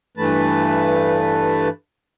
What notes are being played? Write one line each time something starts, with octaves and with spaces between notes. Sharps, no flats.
G2 E3 A3 B4 A5